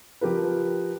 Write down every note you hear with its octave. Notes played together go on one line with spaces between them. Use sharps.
F3 G4 A#4 B4